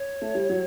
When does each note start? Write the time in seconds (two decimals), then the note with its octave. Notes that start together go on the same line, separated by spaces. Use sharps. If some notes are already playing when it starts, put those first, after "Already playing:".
Already playing: C#5
0.22 A3
0.35 G3
0.49 F#3